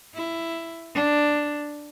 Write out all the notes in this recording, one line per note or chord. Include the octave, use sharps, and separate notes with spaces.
E4
D4